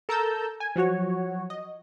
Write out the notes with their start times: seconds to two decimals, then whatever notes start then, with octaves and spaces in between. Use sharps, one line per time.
0.09 A4 A#4 A5 A#5 E6 G6
0.60 G#5
0.76 F3 F#3 F#4 C#5
1.50 D#5